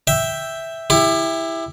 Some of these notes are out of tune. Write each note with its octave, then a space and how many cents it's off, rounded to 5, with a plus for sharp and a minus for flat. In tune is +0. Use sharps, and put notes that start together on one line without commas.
E5 +0 G5 +0
E4 +0 G4 +30